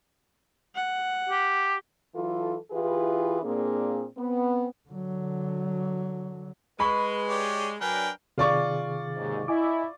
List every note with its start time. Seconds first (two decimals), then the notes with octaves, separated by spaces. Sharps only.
0.75 F#5
1.29 G4
2.15 E3 F#3 F4 A4
2.71 E3 E4 F4 G4 G#4 B4
3.43 A#2 A#3 C4 D4 G#4
4.17 B3 C4
4.89 D3 F#3
6.80 G#3 B4 B5 C#6
7.29 G4 C#5 D5
7.81 F#3 D4 A#4 B4 G5 G#5
8.38 C3 D#3 F4 G#4 D5 C#6
9.16 D#2 G#2
9.48 E4 D#5 G#5 D6